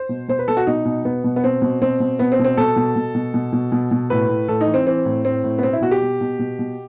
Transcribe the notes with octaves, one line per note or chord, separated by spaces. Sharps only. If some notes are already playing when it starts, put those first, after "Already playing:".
Already playing: C5
B2
B2 C5
B4
B2 A4
F#4
B2 D#4
B2
B2 B3
B2
B3
B2 C4
B2
B2 C4
B2
B2 B3
C4
B2
C4
B2 A4
B2
B2
B2
B2
B2
B2
B2
A2 B4
A2
A2 A4
D#4
E3
C4
E3 C4
A2
A2 C4
A2
B3
B2 C4
E4
B2 F#4
G4
B2
B2
B2
B2